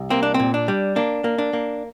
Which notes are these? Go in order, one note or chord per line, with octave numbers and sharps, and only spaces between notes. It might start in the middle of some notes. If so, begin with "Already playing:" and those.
Already playing: C2
A#3 C4
D4
C4
A#2
D4
G3
A#3 D4
A#3
D4
A#3